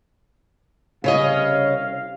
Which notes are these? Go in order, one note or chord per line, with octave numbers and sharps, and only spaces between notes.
C2 C#3 G4 C#5 D#5 F5